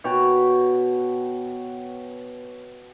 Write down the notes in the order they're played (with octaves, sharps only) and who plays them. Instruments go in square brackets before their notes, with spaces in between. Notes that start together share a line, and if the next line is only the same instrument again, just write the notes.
[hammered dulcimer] B2 F#4 C#5 G5